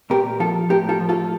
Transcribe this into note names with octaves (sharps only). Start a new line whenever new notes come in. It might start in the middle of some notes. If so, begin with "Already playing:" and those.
A#2 G4 A#4
F3 F4 A4
A2 G4 A#4
F4 A4
F3
F4 A4